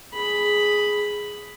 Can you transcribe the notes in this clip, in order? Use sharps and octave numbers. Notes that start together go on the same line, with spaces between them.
G#4 B5